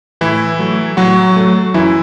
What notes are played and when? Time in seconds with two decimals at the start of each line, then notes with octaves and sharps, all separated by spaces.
0.21 A2 E3 E4
0.59 F#3 A3
0.97 A2 F#3 F#4
1.36 F#3 A3
1.74 F#2 E3 E4